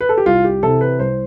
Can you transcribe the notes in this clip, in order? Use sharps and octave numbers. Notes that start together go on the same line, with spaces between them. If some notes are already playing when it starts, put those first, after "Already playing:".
B4
A4
G4
C2 F4
G4
C3 E3 A4
B4
C2 C5